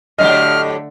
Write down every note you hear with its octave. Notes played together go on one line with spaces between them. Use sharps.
A2 D3 F#3 A3 G4 D#5 F6